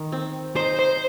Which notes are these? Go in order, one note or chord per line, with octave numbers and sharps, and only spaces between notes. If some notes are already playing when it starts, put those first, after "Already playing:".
Already playing: D#3
C4
D#4 C5
C5